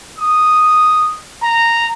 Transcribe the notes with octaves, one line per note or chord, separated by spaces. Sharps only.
D#6
A#5